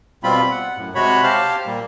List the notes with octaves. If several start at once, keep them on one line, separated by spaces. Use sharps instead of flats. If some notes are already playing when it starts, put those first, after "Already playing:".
B2 G3 C4 F4 B5
F#5
F#2 A2
C3 G#3 F#4 C#5 B5
G4 C5 F5 A5 F6
A#2 G3 A#3